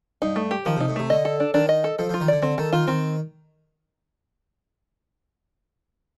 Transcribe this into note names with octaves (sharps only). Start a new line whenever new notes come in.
G2 D#4
A3
G4
D#3 F3
C3
D#4
A2
C3 A3
D3 D#5
A4
D4
D#3 D4
D#5
A4
F3 A4
F3
F4
D#3
D3 D5
D3 C4
D#3 A4
D#3 F4
D#3 C4